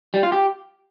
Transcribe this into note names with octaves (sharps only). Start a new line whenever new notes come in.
G3
F4
G4